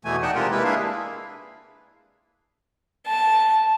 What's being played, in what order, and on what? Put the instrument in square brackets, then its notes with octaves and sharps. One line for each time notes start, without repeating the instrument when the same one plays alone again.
[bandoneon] E2 B2 E3 A3 G#5
D#4 D5 F#5 G5 A5
C3 G#3 F4 G4 A#4
G#3 A#3 E4 B4
A#3 D4 E4 G#4 F5
[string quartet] A5